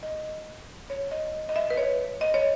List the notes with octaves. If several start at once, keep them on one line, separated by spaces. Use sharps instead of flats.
D#5
C#5
D#5
D#5
E5
B4
C#5
D#5
C#5